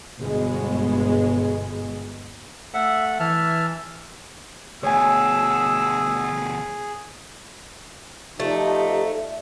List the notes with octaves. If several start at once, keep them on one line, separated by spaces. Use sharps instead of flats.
G1 B2 G#3
A3 E5 F#5
E3 E5 A5 F6
D2 B2 G#4 C#5 G#5 E6
F3 A3 D#4 G4 D5 E5